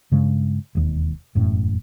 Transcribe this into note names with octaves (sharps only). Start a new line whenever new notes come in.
G2 C#3 G#3
E1 D#2
E1 F#2 A2